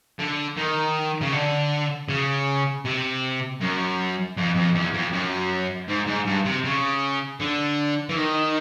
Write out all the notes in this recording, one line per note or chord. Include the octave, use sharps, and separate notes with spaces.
D3
D#3
C#3
D3
C#3
C3
F#2
F2
F2
E2
F2
F#2
G#2
G#2
G2
C3
C#3
D3
E3
D#3